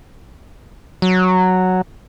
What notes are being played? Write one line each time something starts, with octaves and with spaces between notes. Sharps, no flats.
F#3